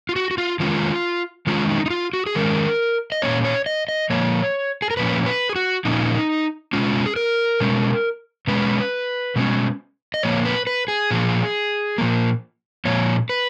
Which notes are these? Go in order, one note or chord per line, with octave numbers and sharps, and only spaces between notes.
F4
F#4
F#4
F4
D#3 G#3 C#4 F4
D#3 G#3 C#4 F4
D#4
D#4
F4
F#4
G#4
D#3 G#3 C#4 A#4
D#5
A#2 F3 A#3 C#4 C#5
C#5
D#5
D#5
A#2 F3 A#3 C#5
G#4
A#4
A#2 F3 A#3 C#4 B4
B4
G#4
F#4
A#2 F3 A#3 C#4 D#4
B2 G#3 C#4 F4
G#4
A#4
B2 G#3 C#4
B2 G#3 C#4 B4
B2 G#3 C#4
D#5
A#2 F3 A#3 C#5
B4
B4
G#4
A#2 F3 A#3
A#2 F3 A#3
A#2 F3 A#3 C#5
B4